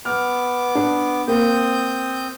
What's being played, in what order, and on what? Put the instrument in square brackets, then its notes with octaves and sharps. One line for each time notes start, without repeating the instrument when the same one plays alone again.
[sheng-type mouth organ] B3 D6 [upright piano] F6
[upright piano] D4
[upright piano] A#3 [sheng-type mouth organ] C4 D#6 G6